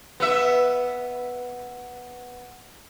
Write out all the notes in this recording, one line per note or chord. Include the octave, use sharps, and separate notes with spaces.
B3 E5